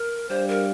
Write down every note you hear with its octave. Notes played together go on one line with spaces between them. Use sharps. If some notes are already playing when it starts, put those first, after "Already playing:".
Already playing: A#4
G3 D4 G4 C5 D5 F5
A#4